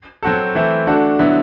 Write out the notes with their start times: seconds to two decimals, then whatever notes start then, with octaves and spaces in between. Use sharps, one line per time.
0.23 F#3 C4 F#4 A4
0.55 E3 A3 C4 E4
0.87 D3 A3 D4 F#4 A4
1.19 D3 F#3 B3 E4